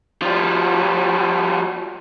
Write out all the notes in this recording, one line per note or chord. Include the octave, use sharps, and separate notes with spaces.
F3 G3